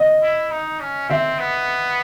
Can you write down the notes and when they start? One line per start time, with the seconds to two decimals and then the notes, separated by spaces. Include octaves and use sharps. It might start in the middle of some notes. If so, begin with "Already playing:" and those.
Already playing: D#5
0.22 E4
0.51 D#4
0.80 C#4
1.09 C4 E5
1.39 B3